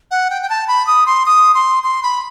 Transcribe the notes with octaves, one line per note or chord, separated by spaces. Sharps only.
F#5
G5
G5
A5
B5
D#6
C6
D#6
C6
C6
B5